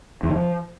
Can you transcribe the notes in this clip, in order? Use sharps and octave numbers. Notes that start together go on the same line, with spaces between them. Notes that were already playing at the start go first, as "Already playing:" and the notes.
E2
D#3
F3